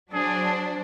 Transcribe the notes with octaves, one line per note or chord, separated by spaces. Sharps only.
F#3 D4 G#4 C5